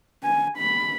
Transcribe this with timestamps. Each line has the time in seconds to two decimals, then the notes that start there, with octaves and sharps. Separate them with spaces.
0.24 G#5
0.58 B5